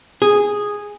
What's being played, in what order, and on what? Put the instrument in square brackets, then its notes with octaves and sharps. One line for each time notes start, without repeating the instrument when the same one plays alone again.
[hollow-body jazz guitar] G#4